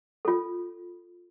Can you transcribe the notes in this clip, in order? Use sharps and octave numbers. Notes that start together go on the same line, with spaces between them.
F4 A4